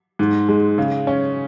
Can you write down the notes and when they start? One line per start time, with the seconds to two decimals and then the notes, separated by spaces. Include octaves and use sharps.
0.19 G#2
0.48 G#3
0.78 C#3
1.07 C#4